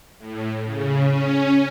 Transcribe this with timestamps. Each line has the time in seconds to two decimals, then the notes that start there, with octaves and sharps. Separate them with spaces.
0.18 A2
0.63 C#3
1.02 C#4